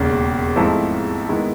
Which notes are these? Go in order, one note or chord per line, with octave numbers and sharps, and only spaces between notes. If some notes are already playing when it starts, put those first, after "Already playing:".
Already playing: E1 D#2 C#3
G#2 F3 A3 C4 E4
G#2 D#3 G#3 B3 E4